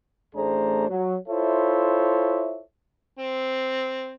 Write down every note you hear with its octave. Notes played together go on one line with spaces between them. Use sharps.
A1 A3 D4 G#4 C5 A#5
F#3
E4 F4 A4 C5 C#5 E5
C4